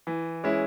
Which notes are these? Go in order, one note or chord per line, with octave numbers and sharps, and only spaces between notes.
E3
G#3 C#4 E4